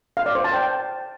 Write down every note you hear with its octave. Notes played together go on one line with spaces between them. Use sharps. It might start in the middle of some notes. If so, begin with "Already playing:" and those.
F5
D5
C5
A5
G5